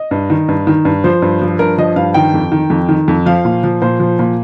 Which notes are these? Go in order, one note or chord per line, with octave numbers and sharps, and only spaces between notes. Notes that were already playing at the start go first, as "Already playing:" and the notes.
Already playing: D#5
G2
D#3
G2
D#3
G2
F3 C5
G2
F3
G2 A#4
F3 D#5
G2 F5
D#3 G5
F2
D#3
F2
D#3
F2
F3 F5
A#2
F3
A#2 C5
F3
A#2